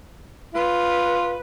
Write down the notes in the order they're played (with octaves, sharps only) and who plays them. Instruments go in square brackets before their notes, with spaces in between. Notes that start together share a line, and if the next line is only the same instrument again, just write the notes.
[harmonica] F4 [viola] B4